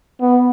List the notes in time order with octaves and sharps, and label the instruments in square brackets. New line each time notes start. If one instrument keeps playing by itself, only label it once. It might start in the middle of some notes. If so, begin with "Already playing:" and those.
[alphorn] B3